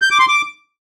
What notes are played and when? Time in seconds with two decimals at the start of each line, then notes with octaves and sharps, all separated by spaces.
0.02 G6
0.11 D6
0.20 C6
0.28 D6